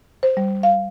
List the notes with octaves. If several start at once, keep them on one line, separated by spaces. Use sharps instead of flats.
C5
G3
F5